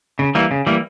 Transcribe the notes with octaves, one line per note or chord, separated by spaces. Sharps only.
C#3
E3 G3 A#3
C#3
E3 G3 A#3